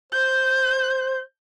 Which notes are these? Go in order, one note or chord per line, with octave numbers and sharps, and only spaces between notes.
C5 G6